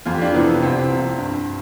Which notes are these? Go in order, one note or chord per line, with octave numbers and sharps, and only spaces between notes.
F2 F4
G4
D4 F4
C3 E3 B3
C2 C4
C3 F3
G2